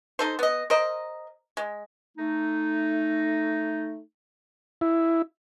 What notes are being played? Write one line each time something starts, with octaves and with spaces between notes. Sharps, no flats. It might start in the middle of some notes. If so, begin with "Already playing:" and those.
D#4 A4 C5
B3 D#5
A#4 C5 D#5
G#3
A3 D#4
E4